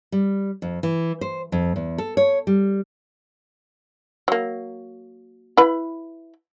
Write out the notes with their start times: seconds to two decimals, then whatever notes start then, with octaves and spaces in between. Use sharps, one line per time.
0.12 G3
0.62 F2
0.83 E3
1.21 C5
1.52 F2
1.76 E2
1.98 A4
2.17 C#5
2.47 G3
4.28 F#3 A#3
5.57 E4 B4 B5